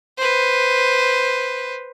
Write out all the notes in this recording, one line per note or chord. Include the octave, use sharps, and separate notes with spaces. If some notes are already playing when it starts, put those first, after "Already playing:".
B4 C5